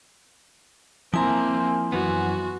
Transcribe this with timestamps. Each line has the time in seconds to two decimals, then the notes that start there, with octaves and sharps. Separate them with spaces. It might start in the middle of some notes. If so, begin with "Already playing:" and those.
1.14 F3 A#3 C4 E4 G#5 A#5 C6
1.92 F#2 E3 B3 F#4